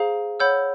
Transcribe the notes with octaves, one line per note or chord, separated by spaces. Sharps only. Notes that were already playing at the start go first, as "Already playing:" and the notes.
Already playing: G#4 C5 F5 A#5
C#5 F#5 B5 E6 G6